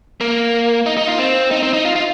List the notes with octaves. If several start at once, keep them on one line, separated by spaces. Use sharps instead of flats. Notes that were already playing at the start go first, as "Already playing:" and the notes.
A#3
D#4
D#4
F4
C4
D#4
C4
D#4
F4
F4